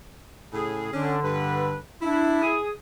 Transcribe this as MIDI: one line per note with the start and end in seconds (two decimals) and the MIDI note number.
0.53 0.93 45
0.53 0.93 49
0.53 0.93 68
0.94 1.76 50
0.94 1.17 61
0.94 1.17 62
1.23 1.79 43
1.23 1.79 69
1.23 1.79 71
2.02 2.42 62
2.02 2.58 64
2.42 2.69 68
2.42 2.69 87